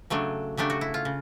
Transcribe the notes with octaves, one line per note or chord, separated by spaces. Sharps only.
C#3 F#3 A3 D4
C#3 F#3 A3 D4 G4
F#4
E4
F4
C#3